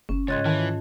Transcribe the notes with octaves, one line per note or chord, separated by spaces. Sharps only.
F#1 C#4
C#2 G#2 C#5 D#5 F#6 G#6 A6
D#3 E3 A5
F4